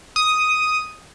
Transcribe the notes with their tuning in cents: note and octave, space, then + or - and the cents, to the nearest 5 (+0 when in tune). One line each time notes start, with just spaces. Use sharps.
D#6 +5